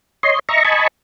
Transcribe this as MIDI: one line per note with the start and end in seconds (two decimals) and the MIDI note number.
0.23 0.39 73
0.23 0.39 75
0.23 0.39 84
0.49 0.63 75
0.49 0.63 76
0.49 0.63 82
0.49 0.63 85
0.65 0.87 75
0.65 0.87 80
0.65 0.87 81
0.65 0.87 83
0.65 0.87 85